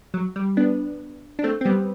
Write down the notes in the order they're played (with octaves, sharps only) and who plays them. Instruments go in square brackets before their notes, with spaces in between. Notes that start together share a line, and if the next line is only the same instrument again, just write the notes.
[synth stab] F#3
G3
B3 D4
D4
A3 C4
C4
G3 B3